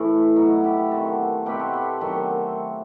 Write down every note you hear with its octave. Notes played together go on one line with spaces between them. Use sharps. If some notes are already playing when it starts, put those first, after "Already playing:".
Already playing: A2 E3 A3 E4
B2 F#3 A3 D#4
E4
E4 G4
E4 G4
D#3 F#3 C4 F#4 A4
B2 A3 C4 G4 B4
A4 C5
G4 B4
D#3 F#3 C4